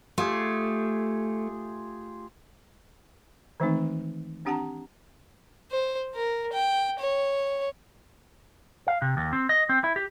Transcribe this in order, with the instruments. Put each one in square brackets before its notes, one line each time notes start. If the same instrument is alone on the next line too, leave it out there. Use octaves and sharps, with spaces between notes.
[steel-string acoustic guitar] A3 [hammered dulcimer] F4 G4 G#4
[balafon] D#3 E3 G#3 A3 C4 D#4
C4 D4 G4 F#5 A5 A#5
[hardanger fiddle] C5
A#4
G5
C#5
[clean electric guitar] F5
C3
D#2
C4
D#5
C4
E4
G4